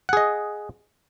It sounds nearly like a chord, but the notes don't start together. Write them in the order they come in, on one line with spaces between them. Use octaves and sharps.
F#5 G#4 D#5